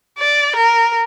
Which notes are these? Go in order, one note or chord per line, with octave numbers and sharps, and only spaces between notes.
D5
A#4